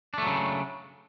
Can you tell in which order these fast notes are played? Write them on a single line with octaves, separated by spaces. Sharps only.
D4 A3 F#3 C#3